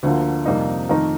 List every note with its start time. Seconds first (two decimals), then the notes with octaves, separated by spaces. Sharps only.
0.03 D2 D3 F3 A#3
0.46 F2 C3 G3 A#3 D#4
0.89 F2 D#3 A3 D#4 A#4